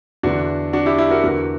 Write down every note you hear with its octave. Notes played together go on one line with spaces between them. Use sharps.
E2 D3 D4 F#4
D4 F#4
E4 G4
E4 G4
F#4 A#4
E2 D3 F#4 A#4